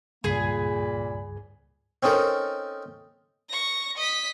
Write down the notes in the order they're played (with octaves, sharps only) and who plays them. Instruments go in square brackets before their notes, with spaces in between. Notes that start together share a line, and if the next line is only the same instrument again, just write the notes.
[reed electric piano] C#2 G2 [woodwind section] A#2 A#3 B5 [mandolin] G#4
[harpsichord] C4 C#4 D#4 A4 A#4
[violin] C#6 A#6
D#5 B6